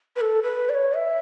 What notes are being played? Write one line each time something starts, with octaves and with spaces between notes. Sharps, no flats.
B4
A4
B4
D5
C#5
E5